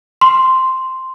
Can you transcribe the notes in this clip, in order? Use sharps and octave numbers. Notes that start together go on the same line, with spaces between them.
C6